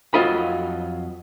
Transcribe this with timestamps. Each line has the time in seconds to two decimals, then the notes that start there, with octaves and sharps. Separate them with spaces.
0.14 F2 F#3 F4 D#5 B5